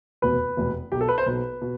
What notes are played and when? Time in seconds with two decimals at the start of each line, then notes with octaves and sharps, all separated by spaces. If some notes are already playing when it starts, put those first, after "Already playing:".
0.22 F1 E2 B2 B4
0.57 F1 E2 B2
0.92 B1 B2 G4
1.01 A4
1.09 B4
1.18 C5
1.26 B1 B2 B4
1.62 B2